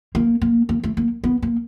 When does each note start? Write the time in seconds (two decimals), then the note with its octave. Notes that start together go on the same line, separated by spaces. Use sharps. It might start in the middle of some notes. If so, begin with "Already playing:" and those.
0.15 A#3
0.41 A#3
0.69 A#3
0.83 A3
0.97 A#3
1.24 B3
1.42 A#3